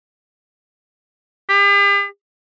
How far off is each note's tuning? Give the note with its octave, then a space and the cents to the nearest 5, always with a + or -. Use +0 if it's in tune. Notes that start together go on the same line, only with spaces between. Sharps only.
G4 +40